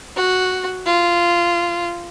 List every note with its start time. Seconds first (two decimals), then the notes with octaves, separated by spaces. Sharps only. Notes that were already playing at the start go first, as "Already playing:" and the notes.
0.16 F#4
0.86 F4